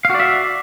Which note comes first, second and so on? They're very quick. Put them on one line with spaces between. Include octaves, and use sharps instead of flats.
F5 F#4 D5 E5